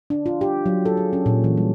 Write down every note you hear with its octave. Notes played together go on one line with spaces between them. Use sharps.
D4
F4
G4
F#3
A4
G#4
C#4
A#2
E3
G3